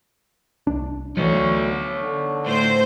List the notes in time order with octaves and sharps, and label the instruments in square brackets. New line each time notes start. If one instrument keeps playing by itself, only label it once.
[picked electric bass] C2 D4
[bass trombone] D2 [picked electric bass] E3 F#3 [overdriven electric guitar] D#4 C#5
[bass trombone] D3
[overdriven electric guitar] A2 [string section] C5